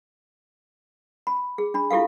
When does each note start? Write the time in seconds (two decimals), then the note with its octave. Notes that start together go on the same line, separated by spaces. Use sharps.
1.27 B5
1.58 G#4
1.74 D4 B5
1.91 E4 F4 G4 A4 F5